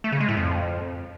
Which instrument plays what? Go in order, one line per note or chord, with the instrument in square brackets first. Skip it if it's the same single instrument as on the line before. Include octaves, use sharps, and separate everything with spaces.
[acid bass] A3
C#3
G#3
A2
F2